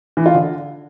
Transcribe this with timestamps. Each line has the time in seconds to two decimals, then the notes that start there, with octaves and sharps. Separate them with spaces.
0.17 E3
0.26 F4
0.34 D3